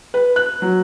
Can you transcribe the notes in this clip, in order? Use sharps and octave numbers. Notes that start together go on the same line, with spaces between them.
B4
F#6
F#3